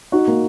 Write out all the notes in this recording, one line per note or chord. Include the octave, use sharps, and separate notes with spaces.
D#4 F#4
A#3